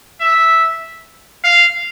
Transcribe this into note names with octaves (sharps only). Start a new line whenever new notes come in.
E5
F5